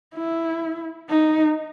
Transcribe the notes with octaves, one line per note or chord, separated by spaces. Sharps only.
E4
D#4